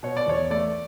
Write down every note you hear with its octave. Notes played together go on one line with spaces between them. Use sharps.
B2 C#5
D5
E2 C#5
A3 D5